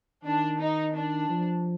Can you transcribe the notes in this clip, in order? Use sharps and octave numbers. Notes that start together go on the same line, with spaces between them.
D#3 D4
D#4
D4
F3